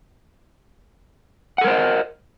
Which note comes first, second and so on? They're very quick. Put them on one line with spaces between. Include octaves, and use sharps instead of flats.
F#5 A4 A#4 C5 D#5